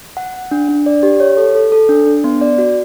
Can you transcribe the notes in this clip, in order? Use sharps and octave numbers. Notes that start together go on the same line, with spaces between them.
F#5
F#5
D4
D4
D5
G4
C#5
A4
A4
A4
D4
D4
B3
D5
F#4